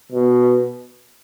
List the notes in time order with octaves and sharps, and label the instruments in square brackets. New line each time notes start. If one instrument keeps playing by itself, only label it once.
[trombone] B2